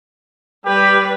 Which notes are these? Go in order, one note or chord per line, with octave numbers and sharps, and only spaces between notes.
G3 G4 B4